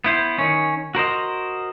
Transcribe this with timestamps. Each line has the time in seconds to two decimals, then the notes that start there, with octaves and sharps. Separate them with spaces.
0.04 B3 E4 C5
0.39 D#3 C#4
0.95 F#4 A#4 C5 D#5